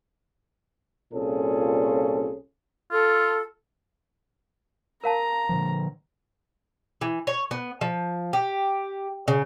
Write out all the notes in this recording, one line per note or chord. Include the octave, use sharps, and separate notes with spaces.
C2 A#2 C#4 F4 G#4 A4
F4 A4
A#4 F5 A5 A#5
A#2 D3 F3
E3
C#5
B3
F3
G4
C#3